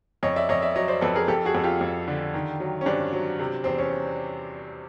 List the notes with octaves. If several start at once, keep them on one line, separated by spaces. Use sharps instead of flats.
F2 C#5 D#5
D5 E5
F2 C#5 D#5
D5 E5
F#3 C#5 D#5
C5 D5
F2 A4 B4
G#4 A#4
F2 G4 A4
F#4 G#4
F2
F4 G4
F2
D3
D#3
F#3
C#4
G2 C4 D4
F#3
C3
E2 C4
C#4